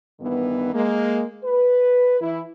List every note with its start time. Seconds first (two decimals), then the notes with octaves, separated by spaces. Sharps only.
0.20 G2 D#3 E3 B3
0.73 G#3 A#3
1.43 B4
2.20 E3 E4